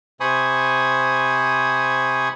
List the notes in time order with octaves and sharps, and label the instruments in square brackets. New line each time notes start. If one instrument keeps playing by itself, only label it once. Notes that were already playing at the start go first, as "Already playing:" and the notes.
[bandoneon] C3 C5 G#5 B5 C#6 D#6